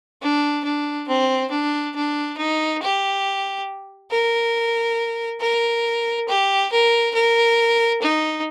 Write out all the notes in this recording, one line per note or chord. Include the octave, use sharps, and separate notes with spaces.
D4
D4
C4
D4
D4
D#4
G4
A#4
A#4
G4
A#4
A#4
D#4